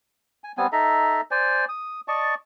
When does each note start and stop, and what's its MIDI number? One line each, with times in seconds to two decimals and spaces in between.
0.44 0.52 80
0.58 0.67 55
0.58 0.67 59
0.58 0.67 60
0.58 0.67 80
0.72 1.21 63
0.72 1.21 69
0.72 1.21 76
0.72 1.21 82
1.31 1.65 72
1.31 1.65 74
1.31 1.65 80
1.69 2.01 87
2.08 2.35 74
2.08 2.35 75
2.08 2.35 81
2.08 2.35 85